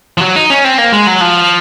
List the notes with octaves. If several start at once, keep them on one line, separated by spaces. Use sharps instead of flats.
F3
F#3
D#4
C#4
C4
A#3
G#3
F#3
F3